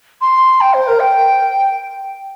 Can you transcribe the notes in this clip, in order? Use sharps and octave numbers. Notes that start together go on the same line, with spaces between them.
C6
G5
C5
A#4
G5